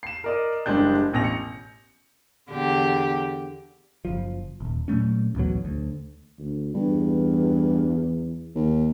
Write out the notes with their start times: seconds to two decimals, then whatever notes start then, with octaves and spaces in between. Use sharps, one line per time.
0.03 C7 E7
0.24 A#4 D5 D#5
0.66 F#1 G3 G#3 D4 G6
1.12 E1 A1 A#6 F7
1.24 C#7
2.50 E2 D3 G4
4.05 F#1 C2 F3
4.60 D#1 G#1
4.88 A#2 F#3 A3 C#4
5.35 A1 D2 B2 F#3
5.65 D2
6.39 D2
6.74 E2 G2
8.55 D#2